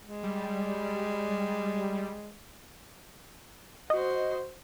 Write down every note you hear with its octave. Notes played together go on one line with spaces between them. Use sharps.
G#3
G3
F#4 C5 D#5